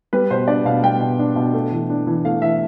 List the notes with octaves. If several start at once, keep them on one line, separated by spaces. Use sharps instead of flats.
G3 B4
B2 C5
D4 D5
B2 F5
G3 G5
B2
D4
B2
A3
E3
D4
E3
A3 F5
E3 E5